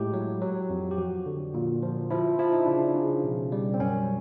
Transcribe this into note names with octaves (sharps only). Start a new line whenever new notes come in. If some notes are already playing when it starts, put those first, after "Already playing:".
Already playing: A2 G#3 G4
F#3
F#3
F2
G4
F3 F#4
D3
A#2
F3
F3 E4
F3 E4
D#4
C#3 D4
D#4
C#3
B2
G3
C4
F#2 C#4